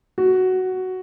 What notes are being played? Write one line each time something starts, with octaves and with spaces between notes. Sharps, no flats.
F#4